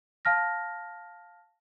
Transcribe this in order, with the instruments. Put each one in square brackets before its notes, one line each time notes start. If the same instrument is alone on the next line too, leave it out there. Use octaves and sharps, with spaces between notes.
[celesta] F5 A5 F6 A#6